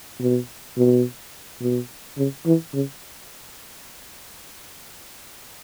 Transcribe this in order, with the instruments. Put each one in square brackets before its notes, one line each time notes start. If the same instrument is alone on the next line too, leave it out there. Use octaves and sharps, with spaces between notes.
[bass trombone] B2
B2
B2
C#3
E3
C#3